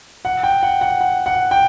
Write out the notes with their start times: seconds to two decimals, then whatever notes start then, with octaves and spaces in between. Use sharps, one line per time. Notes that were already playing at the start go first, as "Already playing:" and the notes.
0.25 F#5
0.43 G5
0.63 F#5
0.81 F#5
1.01 F#5
1.26 F#5
1.51 G5